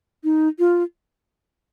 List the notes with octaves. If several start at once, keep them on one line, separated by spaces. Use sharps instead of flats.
D#4
F4